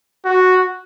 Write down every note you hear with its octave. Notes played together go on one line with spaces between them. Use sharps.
F#4